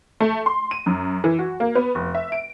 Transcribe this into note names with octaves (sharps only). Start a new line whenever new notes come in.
A3
C6
D#7
F#2
E3
F#4
A#3
B3
F1
E5
D7